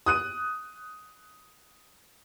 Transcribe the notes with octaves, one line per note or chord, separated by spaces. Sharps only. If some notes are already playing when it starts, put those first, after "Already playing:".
D#6 F#6 D#7